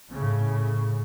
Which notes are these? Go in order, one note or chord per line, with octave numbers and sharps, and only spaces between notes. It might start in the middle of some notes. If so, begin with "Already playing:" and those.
A2 C#3